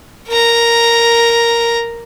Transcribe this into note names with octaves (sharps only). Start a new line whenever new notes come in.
A#4 A#5